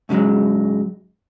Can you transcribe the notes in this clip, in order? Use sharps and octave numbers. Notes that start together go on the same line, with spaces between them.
G#2 C#3 E3 F#3 G#3